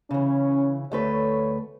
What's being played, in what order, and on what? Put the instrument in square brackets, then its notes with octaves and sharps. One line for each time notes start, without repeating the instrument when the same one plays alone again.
[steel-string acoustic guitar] C#3 E3 [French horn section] C#4
[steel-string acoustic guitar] D2 A3 B4 [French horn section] C#5